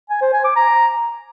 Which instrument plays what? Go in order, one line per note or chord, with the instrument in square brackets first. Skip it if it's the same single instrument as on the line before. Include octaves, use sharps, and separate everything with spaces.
[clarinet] G#5
C5
G#5
D6
A#5